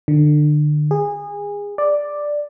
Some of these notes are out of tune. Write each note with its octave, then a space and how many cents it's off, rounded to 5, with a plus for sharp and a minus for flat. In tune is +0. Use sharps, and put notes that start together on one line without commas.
D3 +30
G#4 -25
D5 +5